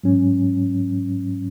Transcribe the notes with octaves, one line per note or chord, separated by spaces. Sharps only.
G#2 F#3 C#4